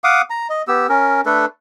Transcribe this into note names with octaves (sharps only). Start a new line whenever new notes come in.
F5 F#5 D6 D#6
A#5
D#5
B3 G4 E6
C#4 A#4
A3 D4 A4 B4